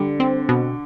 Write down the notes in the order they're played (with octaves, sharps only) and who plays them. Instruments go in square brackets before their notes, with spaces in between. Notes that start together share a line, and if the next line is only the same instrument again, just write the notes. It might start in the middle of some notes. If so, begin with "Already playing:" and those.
Already playing: [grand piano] D3 [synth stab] G3
[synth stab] C4
B2